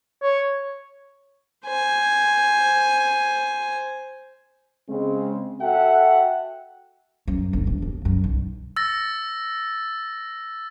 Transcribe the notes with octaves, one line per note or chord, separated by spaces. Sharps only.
C#5
C5 G#5
C#3 G#3 C4
F#4 A4 E5 F#5 G5
F#2
G1
E1
D#2
F#2
B1
E6 A6 A#6